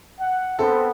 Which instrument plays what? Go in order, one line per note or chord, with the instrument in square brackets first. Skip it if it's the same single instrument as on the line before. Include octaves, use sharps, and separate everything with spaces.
[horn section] F#5
[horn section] B3 C4 [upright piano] A4